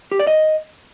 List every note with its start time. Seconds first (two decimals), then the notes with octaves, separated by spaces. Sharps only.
0.12 G4
0.19 D5
0.27 D#5